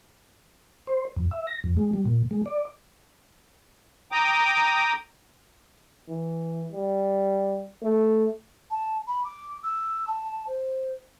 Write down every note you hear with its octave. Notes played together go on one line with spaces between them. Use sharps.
C5
F2
E5
A#6
F2
G#3
G3
A#2
G#3
D5
G5 A#5 D6 D#6
E3
G3
A3
A5
B5
D6
E6
A5
C5